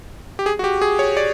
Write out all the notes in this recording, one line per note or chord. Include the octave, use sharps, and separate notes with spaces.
G4
G#4
F#4
G4
G#4
C#5
D5